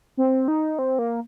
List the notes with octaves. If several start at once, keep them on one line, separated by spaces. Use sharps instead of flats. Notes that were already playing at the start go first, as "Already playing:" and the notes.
C4
D#4
C4
A#3